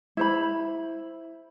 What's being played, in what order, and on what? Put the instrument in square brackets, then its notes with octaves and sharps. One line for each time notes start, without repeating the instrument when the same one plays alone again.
[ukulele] E4 C5 B5